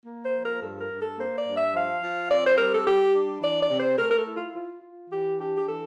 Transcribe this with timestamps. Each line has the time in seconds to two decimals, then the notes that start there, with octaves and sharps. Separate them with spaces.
0.06 A#3
0.24 C5
0.34 F3
0.43 A#4
0.61 G2 A4
0.80 A#4
0.90 G2
0.99 A4
1.18 A#3 C5
1.37 D5
1.46 G2
1.55 E5
1.74 F3 F5
2.02 F3
2.29 C4 D5
2.44 C5
2.57 G3 A#4
2.72 A4
2.86 G3 G4
3.13 D4
3.42 E3 D5
3.61 D5
3.70 C3
3.80 C5
3.98 A3 A#4
4.10 A#4
4.17 A4
4.25 E4
4.35 F4
4.54 F4
4.82 F4
5.10 E3 G4
5.38 D4 G4
5.57 G4
5.66 E3 A4